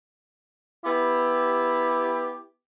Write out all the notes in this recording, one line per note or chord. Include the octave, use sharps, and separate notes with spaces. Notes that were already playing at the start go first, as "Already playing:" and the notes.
B3 E4 G4